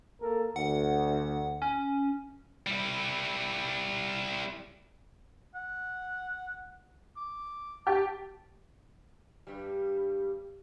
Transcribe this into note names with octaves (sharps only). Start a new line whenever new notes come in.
A#3 A4 A#4
D2 F#5
C#4
G3 E4
F#5
D6
G4 A5
G2 G3